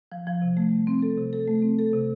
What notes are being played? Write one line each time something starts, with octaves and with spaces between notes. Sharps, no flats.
F3
F3
C3
A3
G3
C4
A4
C3
A4
A3
C4
A4
C3